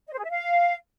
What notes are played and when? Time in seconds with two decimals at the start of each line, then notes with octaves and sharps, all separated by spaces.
0.07 D#5
0.13 C5
0.18 G#4
0.24 E5
0.30 F5